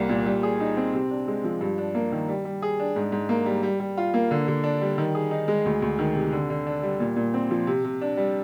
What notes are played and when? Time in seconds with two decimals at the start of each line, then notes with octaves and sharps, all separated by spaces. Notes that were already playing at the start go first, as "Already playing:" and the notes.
Already playing: C2 G3 A#3
0.09 A#2
0.26 G3
0.43 G#4
0.60 D#4
0.77 C4
0.94 C3
1.11 D4
1.28 G#3
1.44 F3
1.61 G2
1.78 D4
1.95 A#3
2.12 D#3
2.28 G3
2.45 G3
2.62 G#4
2.80 D4
2.96 G#2
3.12 G#2
3.29 A#3
3.46 G3
3.63 G3
3.80 G3
3.98 F4
4.14 A#3
4.31 D3
4.48 D3
4.64 D4
4.81 G3
4.98 D#3
5.15 G#4
5.31 D#4
5.48 G#3
5.66 D2
5.82 D2
5.99 D#3
6.15 C3
6.32 D3
6.50 D3
6.67 D4
6.83 G3
7.00 A#2
7.16 A#2
7.34 C4
7.51 F3
7.67 C3
7.84 C3
8.02 D4
8.17 G3